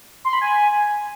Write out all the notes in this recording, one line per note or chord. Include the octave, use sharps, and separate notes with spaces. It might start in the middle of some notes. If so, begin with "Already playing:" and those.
C6
B5
G#5